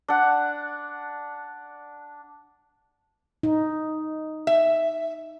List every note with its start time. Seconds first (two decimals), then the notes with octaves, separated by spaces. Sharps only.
0.08 D4 F#5
3.43 D#4
4.47 E5